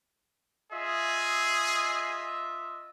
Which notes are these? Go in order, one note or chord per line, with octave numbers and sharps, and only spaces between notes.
F4 G#4 D#5 E5